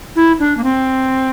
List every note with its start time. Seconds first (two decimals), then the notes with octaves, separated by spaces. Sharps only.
0.16 E4
0.40 D4
0.57 A#3
0.64 C4